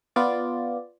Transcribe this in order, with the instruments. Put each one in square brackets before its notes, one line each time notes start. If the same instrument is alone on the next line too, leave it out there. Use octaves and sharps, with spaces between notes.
[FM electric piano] B3 F4 D5